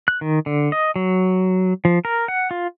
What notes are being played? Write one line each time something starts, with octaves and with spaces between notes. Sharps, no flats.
F#6
D#3
D3
D#5
F#3
F3
A#4
F#5
F4